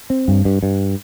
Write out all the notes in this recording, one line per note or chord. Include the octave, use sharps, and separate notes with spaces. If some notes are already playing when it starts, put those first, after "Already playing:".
C4
G2
G2
G2